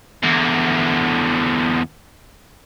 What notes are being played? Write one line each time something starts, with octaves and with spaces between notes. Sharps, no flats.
E2 D3